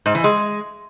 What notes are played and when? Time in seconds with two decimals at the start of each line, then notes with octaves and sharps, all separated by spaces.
0.06 G#2
0.15 E3
0.24 G#3